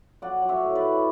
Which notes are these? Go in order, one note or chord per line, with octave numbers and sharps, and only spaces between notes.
F#3 D5 F#5
F#3
C#5 E5
A2
B4 D5
A2